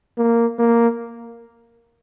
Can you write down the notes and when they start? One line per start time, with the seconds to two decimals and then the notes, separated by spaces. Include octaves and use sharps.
0.18 A#3
0.59 A#3